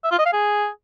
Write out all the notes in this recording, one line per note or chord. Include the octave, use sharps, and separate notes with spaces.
E5
F4
D#5
F5
G#4